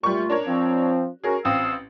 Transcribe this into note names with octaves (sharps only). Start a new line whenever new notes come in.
A#2 G3 A3 F4 C#6
D4 A#4 C#5
F3 C4
C#4 F#4 G#4 A#4
A1 F3 C4 F5 D#6 E6